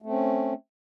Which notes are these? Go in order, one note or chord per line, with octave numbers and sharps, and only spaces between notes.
A3 C4 C#4